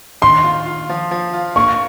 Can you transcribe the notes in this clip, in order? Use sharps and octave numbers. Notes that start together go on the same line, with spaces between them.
D#3 C6
F4
F4
F3
F3
F4
A#3 C#6